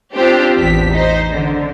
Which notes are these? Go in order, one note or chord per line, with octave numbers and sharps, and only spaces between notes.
C4 D4 F4 G4 C5
A1 E2 B6
D#4 C5
D3